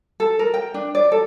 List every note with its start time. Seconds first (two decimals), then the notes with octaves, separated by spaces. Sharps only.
0.20 A4
0.39 A#4
0.54 G5
0.74 D4
0.95 D5
1.12 A4